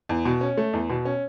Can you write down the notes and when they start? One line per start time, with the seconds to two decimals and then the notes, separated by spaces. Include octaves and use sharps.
0.09 E2
0.25 B2
0.41 C#4
0.57 A3
0.73 E2
0.90 B2
1.05 C#4